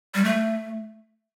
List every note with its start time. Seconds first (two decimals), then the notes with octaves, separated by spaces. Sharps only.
0.14 G3
0.24 A3